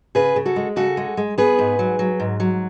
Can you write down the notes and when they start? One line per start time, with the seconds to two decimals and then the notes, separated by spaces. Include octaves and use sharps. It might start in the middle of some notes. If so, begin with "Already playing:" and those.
0.15 C#3 G#4 B4
0.36 C#3
0.46 F#4 A4
0.56 G#3
0.76 C#3 F#4 A4
0.97 G#3
1.17 G#3
1.38 B3 G#4 B4
1.59 G#2
1.79 F#3
1.99 F#3
2.20 G#2
2.40 F#3